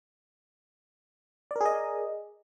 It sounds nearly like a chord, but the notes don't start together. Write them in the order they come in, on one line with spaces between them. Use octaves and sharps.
D5 A#4 G#4 D#5